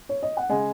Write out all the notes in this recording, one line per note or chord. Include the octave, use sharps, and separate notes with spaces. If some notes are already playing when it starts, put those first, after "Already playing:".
C#5
D#5
F#5
C#3 G#3 D#5 G#5